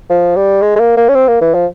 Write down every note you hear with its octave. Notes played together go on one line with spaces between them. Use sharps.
F3
G3
G#3
G#3
A#3
A#3
C#4
C4
A#3
E3
F3